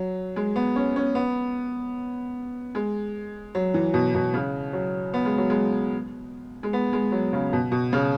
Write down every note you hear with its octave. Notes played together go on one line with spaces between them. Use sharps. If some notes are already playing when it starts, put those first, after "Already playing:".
Already playing: F#3
G#3
B3
C#4
C#4
B3
G#3
F#3
E3
B2
B2
C#3
F#3
B3
G#3
F#3
G#3
G#3
B3
G#3
F#3
C#3
B2
B2
C#3